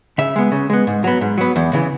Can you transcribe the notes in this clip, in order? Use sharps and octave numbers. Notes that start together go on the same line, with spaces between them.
C#3 E5
G#3 B3
C#3
G#3 B3
G#2
F#3 B3
G#2
F#3 B3
E2
C#3 E3